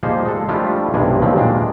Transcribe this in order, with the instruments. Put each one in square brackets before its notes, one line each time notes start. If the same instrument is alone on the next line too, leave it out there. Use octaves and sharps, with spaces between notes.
[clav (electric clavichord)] F3 G3 A#3 D#4 G#4 C5
G#3 A4
F3 G3 A3 D4 E4 F4
B1 G2 C3 G#3 D5 G#5
D#2 E3 F3 A3 C4
A#2 G#3 D4 G5